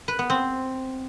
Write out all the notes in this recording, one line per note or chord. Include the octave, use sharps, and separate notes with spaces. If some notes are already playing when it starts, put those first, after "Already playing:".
B4
B3
C4